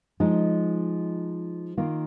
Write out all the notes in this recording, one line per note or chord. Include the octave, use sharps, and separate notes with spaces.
F3 G#3 D#4
D#3 A#3 F4